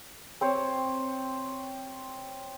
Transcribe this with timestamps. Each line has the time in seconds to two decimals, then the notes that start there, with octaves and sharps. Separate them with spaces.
0.41 C4 C5 C#5